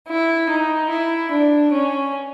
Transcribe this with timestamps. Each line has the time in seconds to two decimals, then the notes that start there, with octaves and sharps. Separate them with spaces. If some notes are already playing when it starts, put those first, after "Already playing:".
0.10 E4
0.51 D#4
0.91 E4
1.33 D4
1.73 C#4